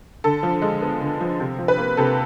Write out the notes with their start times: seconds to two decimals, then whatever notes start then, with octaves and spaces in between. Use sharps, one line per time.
0.24 D3 A4
0.43 F3
0.62 G#3
0.82 B3
1.01 D3
1.20 F3
1.40 C3
1.58 F3
1.68 B4
1.78 A#3
1.97 C3 A4